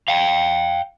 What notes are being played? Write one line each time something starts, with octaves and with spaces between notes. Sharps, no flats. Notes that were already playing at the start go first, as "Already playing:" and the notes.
F5 G5